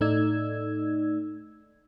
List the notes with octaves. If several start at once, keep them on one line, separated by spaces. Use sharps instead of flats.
A2 A3 D#4 D5 E6 G#6